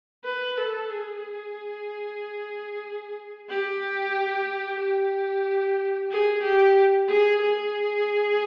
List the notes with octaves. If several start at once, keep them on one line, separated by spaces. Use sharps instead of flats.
B4
A4
G#4
G4
G4
G#4
G4
G#4
G#4